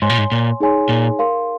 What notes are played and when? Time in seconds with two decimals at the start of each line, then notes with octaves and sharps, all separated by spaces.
0.02 G#2 C#5 G#5 C6
0.09 A#2
0.18 G#2
0.32 A#2
0.60 D#4 G#4 C#5 G#5 C6
0.89 A#2
1.19 A#4 F5 C6